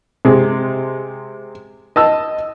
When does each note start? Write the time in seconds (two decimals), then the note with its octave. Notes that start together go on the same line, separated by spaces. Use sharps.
0.25 C3 G#3
1.96 D#5 A5 E6